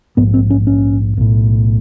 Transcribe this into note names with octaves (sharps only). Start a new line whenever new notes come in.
A#1 G#2 B3
C4
C#4
C#4
B1 A2